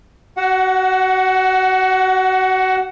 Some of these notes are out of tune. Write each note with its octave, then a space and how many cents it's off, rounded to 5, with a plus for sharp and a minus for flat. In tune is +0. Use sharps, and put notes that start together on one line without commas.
F#4 +25 F#5 +0